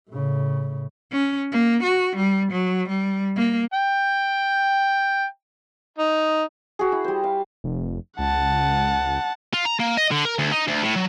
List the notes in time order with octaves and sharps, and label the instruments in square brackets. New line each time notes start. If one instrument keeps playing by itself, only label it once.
[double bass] A2 C#3
[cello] C#4
A#3
F#4
G3
F#3
G3
A#3
[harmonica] G5
D#4
[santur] F#4 G#4
E4
G3 C5
F5
[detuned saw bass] F1
[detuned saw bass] C#2 [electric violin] F#5 A5
[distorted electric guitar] F4
A#5
A#3
D#5
D3
A#4
D2
D#4
D2
A2
F#3